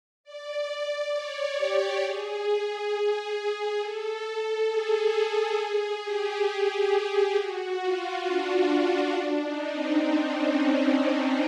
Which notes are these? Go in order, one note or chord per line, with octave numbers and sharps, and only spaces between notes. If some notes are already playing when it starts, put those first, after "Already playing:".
D5
C#5
G4
G#4
G#4
A4
G#4
G#4
G4
G#4
F#4
F4
D4
D4
D#4
C4
C4
C#4